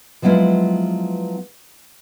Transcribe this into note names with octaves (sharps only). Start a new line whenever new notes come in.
F3 F#3 G#3 B3 E4 F4